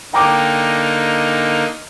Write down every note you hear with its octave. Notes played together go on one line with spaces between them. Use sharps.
D3 A#3 D#4 G5 A#5 D6